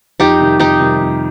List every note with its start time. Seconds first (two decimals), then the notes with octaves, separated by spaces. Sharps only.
0.20 F2 D#4 G4
0.39 C3 D#3 G3
0.60 F2 D#4 G4
0.80 C3 D#3 G3
0.99 F2